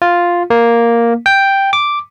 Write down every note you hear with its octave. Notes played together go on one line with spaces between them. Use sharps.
F4
A#3
G5
D6